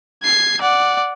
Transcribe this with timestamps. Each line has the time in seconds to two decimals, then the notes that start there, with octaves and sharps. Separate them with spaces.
0.23 G#6 C7
0.61 D5 F#5